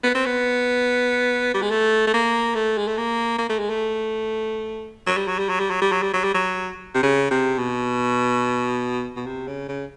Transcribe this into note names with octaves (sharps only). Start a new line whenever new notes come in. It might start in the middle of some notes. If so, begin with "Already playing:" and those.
B3
C4
B3
G3
G#3
A3
A3
A#3
A3
G#3
A3
A#3
A#3
A3
G#3
A3
F#3
G3
F#3
G3
F#3
G3
F#3
G3
F#3
G3
F#3
G3
F#3
C3
C#3
C3
B2
B2
C3
C#3
C#3